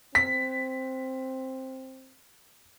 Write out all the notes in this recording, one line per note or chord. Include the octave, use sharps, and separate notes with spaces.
C4 B6